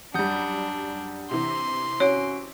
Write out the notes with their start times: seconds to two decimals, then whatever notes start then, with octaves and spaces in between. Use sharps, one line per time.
0.14 F#2 G3 D4 F#5 D#6 G6
1.31 C3 E3 C6
2.00 C#4 F#4 C#5 D7